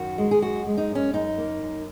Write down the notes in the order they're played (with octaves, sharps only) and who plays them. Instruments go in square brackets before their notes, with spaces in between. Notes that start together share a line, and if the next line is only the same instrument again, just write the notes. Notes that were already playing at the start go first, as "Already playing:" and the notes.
Already playing: [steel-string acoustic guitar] F#2 D#3 F#4
G#3
G#4
F#2 F#4
G#3
D#4
F#2
C#4
F#2 D#4
A#3
F#2